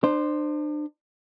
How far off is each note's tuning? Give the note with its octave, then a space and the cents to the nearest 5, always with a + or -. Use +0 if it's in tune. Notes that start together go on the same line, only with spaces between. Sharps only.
D4 +35 C5 +0